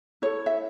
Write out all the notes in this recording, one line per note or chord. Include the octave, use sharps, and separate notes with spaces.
E4 A4 C#5
E5